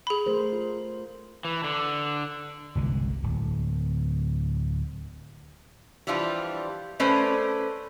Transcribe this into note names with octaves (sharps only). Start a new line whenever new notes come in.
G#4 B5
A3 A#4 C5
F4
E3
D3
G1 C2 G#3
D1
E3 F3 G3 D4 F4
A3 C#4 A4 B4 C5 D5